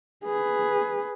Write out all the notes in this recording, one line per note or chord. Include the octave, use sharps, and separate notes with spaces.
G#4 B4